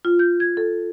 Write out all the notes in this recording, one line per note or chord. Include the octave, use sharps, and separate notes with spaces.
F4
G6
G#6
A4